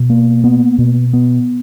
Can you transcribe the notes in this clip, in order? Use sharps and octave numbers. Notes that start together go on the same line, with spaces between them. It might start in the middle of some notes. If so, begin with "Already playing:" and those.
Already playing: B2
A#3
B3
B2
B3